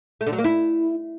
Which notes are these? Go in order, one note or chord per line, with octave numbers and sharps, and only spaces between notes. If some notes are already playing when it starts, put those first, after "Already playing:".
A3
D3
F#3
A#3
E4